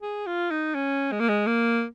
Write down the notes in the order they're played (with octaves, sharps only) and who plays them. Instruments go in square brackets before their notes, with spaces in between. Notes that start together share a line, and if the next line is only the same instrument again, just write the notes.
[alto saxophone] G#4
F4
D#4
C#4
G#3
A#3
G#3
A#3